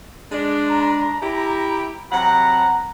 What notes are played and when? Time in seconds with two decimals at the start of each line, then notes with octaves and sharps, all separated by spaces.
0.32 G#3 D4
0.71 A#5
1.22 E4 G4
2.12 C3 F#3 F#5 A#5